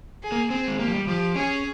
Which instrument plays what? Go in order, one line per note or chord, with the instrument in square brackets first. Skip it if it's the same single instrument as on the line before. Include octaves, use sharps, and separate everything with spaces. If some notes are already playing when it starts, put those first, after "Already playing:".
[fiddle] G#4
[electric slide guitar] A#3
[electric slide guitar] C4 [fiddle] G#4
[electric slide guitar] G#3
[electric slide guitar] A#3 [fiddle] G4
[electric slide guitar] F3
G3
[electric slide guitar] F3 [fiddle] G4
[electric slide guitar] C#4 [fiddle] G#4